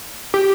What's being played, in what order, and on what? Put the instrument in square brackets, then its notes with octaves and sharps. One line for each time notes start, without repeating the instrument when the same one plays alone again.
[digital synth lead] G4